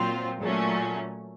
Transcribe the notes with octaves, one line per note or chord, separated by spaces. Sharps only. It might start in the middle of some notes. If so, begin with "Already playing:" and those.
Already playing: A#2 F#3 C4 F4
A#2 F#3 A3 C#4